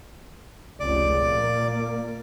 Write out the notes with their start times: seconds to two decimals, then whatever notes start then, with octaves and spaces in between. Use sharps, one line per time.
0.80 F1 C#2 D5
1.20 A#2 A#3